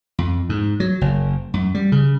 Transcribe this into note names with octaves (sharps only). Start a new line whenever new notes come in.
F2
G#2
F#3
F#1
F#2
G3
C#3